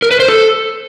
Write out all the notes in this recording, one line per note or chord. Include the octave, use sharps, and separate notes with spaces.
A#4
B4
C5
A4